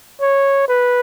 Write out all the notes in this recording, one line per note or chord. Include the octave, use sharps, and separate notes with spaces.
C#5
B4